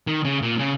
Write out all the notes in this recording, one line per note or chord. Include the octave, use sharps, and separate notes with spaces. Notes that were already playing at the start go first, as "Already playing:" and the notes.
D#3
C#3
A#2
C#3